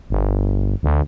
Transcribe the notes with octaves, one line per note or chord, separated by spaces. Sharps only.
G1
D2